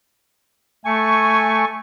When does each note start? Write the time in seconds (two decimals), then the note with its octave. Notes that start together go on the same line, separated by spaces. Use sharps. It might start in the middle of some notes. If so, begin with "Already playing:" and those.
0.85 A3 G#5 C#6